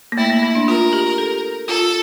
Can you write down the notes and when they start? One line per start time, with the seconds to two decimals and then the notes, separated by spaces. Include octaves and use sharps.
0.12 A#3
0.17 A3 E4
0.30 A#3
0.43 A#3
0.55 D4
0.68 F4 A#4
0.93 G4
1.18 A4
1.68 F4 A4